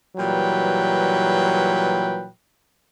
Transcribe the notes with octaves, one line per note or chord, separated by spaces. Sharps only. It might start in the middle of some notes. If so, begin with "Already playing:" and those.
A#2 E3 F#3 G3 B4 G5